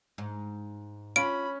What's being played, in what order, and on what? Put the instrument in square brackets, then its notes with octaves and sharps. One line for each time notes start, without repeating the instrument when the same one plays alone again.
[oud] G#2
[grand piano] C#4 [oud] F4 [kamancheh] B5 [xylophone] D7